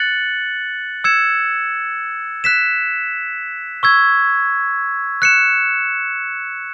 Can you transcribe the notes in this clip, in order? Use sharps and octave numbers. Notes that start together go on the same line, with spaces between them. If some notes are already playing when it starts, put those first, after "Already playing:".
Already playing: F#6 A6 C#7 F#7
E6 G#6 C#7 E7
F#6 B6 E7
C#6 E6 G#6
F#6 C#7 E7